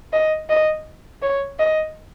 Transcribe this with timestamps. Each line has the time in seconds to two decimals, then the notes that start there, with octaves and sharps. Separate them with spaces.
0.13 D#5
0.49 D#5
1.22 C#5
1.59 D#5